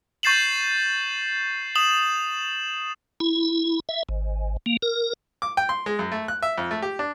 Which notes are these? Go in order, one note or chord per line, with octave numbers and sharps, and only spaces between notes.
C#6 G6 A6 C7 E7 F#7
D#6 E7 F#7
E4
E5
G#1
A#3
A#4
D6
G5
C6
G#3
F#2
A3
F#6
E5
F2
A3
G4
D4